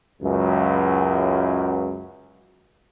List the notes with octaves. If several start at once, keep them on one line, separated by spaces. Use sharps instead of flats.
C#2 F#2